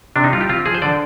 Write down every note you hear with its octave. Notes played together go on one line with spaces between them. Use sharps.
C3 D4
D#4
G3 F4
G4
C4 F4
F3 G#4
C5
D3 D5